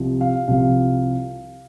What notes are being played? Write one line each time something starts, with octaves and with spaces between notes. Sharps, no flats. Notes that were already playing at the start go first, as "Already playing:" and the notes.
Already playing: C2 C3 F3
F5
C2 C3 F3 F5